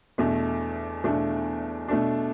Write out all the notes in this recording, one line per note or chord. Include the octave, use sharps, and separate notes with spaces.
E2 B2 A3 D4
E2 B2 A3 D4
B2 A3 D4